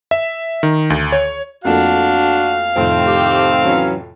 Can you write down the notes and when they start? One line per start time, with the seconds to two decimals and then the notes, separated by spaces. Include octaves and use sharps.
0.11 E5
0.63 D#3
0.90 D2
1.12 C#5
1.65 F2 A3 A#3 D4 F#4 F5
2.76 F2 A2 C3 D#3 A3 C4
3.07 G4
3.65 E3 F#3 C#4